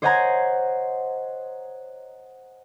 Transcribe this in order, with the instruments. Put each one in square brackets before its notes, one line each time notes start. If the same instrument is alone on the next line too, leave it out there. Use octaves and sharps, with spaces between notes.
[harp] C5 C#5 D#5 F#5 G#5 A#5